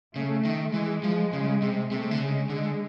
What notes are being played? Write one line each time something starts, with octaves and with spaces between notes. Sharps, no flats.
C#3 A3
D#3
E3 G#3
F3
C#3
C3
C3 A3
D3
C#3 G#3
D3 G#3